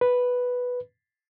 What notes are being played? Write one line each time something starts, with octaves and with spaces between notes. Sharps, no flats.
B4